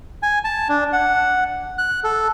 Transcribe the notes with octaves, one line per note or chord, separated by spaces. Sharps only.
G#5
A5
D4
F#5
F#6
A4